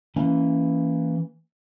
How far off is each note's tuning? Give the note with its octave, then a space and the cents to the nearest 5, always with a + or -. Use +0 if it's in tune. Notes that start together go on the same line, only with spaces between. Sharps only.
E3 +0 A#3 -15 C#4 +0